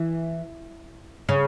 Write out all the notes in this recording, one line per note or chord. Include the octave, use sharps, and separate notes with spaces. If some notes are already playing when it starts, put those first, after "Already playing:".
Already playing: E3
C#3